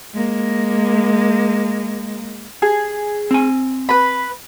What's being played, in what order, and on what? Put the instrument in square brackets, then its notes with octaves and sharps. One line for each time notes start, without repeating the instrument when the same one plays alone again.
[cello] G#3 A#3
[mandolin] G#4
[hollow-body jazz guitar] C4 G#5
[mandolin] B4 B5